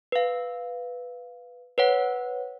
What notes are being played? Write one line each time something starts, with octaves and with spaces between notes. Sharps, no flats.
B4 F5
B4 C#5 F#5